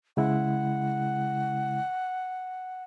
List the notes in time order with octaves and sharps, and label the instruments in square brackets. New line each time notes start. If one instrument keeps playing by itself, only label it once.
[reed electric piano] C#3 G#3 E4 [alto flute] F#5